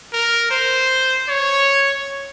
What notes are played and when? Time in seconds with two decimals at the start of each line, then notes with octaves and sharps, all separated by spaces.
0.13 A#4
0.51 C5
1.29 C#5